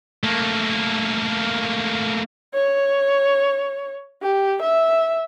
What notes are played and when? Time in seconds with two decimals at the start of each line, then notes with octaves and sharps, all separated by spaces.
0.24 A3 A#3
2.54 C#5
4.23 G4
4.62 E5